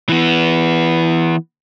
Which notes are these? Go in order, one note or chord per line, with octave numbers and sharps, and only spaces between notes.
E3 B3